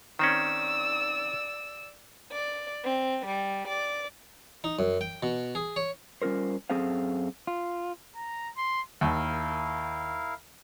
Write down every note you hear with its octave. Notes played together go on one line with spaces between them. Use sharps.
D#3 C4 C#4 D5 E6
D5
C4
G3
D5
D#4
F#2
G5
B2
G#4
C#5
G3 C#4 F4 A#4 C5
F#2 C4 G#4 A4 C5 F5
F4
A#5
C6
D#2 E4 A#4 F5